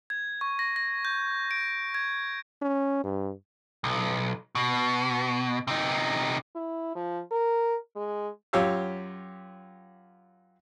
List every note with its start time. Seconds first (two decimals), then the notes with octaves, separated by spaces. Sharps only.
0.10 G#6
0.41 C#6
0.59 A#6
0.76 A#6
1.05 G6
1.51 D7
1.95 G#6
2.62 C#4
3.04 G2
3.84 B1
4.55 B2
5.68 C3 D#4
6.55 E4
6.96 F3
7.31 A#4
7.96 G#3
8.53 F#2 F4 G4 C#5 F5 E6